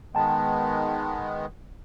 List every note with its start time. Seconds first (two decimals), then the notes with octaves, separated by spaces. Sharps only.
0.15 D#3 G#3 B3 G5 A5